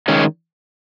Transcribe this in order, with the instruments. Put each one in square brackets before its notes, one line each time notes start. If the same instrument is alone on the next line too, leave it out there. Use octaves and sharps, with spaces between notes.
[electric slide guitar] D#3 G#3 C#4